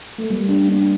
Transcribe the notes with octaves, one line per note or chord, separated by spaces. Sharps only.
A3
G3 A#3
A#3 D4
A#3 D4